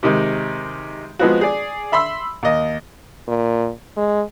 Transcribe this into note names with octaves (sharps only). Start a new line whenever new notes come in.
C3 D#3 G#3
F3 G#3 B3 C4 F#4
G#4 D5
E5 B5 C6 E6
D#2 D#5
A#2
G#3